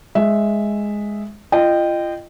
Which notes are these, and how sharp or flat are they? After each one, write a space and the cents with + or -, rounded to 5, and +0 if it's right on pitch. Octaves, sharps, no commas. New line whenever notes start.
G#3 +0 E5 +0
F4 -30 D#5 -25 G5 +0